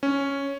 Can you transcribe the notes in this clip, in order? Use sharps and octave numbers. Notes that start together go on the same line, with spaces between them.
C#4